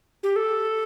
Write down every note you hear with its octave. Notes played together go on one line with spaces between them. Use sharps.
G4
A4